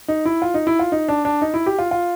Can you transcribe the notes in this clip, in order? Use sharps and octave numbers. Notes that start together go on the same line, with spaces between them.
D#4
E4
F4
D#4
E4
F4
D#4
D4
D4
D#4
E4
G4
F4
F4